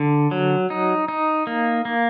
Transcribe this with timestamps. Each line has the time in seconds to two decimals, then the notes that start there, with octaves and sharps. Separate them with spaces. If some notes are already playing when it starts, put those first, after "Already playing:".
Already playing: D3
0.31 F#3
0.70 D#4
1.08 D#4
1.47 A#3
1.85 A#3